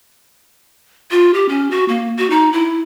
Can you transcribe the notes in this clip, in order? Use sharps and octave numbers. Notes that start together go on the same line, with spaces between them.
F4
G4
C#4
F#4
A#3
F#4
D#4
E4